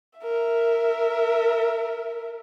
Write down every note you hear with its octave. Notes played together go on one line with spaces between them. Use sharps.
A#4 E5